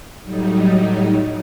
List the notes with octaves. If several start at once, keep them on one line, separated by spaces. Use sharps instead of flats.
A2 F#3 G3 D#4